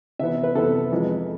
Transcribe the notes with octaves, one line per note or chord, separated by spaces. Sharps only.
C3 E3 B3 E5
B4
C3 E3 B3 A4
F2 E3 G#3